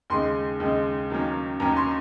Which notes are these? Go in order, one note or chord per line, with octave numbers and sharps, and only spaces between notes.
D#2 C#3 G#3 C6
D#2 C#3 G#3
D#2 D#3 F#3 A#3 C#4
D#2 D#3 F#3 A#3 C#4 A#5
C6